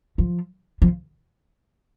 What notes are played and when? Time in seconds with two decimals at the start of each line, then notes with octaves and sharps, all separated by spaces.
0.18 F3
0.82 F3